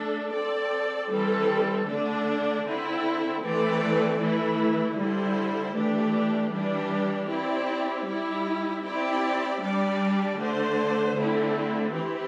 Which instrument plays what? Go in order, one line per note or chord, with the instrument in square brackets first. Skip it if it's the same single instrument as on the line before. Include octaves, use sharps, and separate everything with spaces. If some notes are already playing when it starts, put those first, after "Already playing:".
Already playing: [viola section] A3 D4 A4
C4 A4 D5
E3 G3 C4 A4
D3 A3 D4
D3 C4 E4
E3 A3 C4 A4 D5
E3 A3 E4
D3 G3 E4 C5
E3 A3 D4 G4
E3 G3 D4 G4
C4 E4 G4 D5
G3 E4 G4
C4 E4 G4 D5
G3 D4 G4 D5
D3 A3 D4 C5
D3 A3 C4 E4
E3 C4 E4 G4